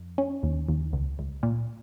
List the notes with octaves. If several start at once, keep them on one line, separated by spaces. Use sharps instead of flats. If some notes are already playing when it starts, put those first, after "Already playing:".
Already playing: F2
C#4
D#2
D#2
C#2
C#2
A#2